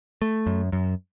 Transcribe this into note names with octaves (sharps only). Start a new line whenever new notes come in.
A3
F#2
F#2